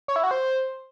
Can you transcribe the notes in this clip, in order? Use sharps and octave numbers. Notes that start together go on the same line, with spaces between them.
C#5
E4
F#4
C5